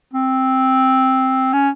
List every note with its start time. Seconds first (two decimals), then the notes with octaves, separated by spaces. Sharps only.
0.13 C4
1.53 C#4